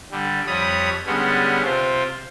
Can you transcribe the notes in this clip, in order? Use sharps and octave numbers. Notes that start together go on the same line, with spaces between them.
D3 G3
F2 G3 C#5 B5 D#6
D3 G3 G#3 B3 C#4
C3 C4 F4